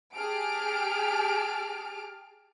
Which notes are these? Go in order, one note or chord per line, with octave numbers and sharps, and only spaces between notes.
G4 G#4 A5 F6 D7